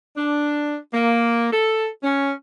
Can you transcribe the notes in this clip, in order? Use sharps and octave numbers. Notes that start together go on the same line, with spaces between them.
D4
A#3
A4
C#4